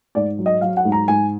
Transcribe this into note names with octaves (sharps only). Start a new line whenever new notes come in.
G#2 D5
F#3
D#5
F#3 F5
F#5
G#2
A#5
G#2 G#5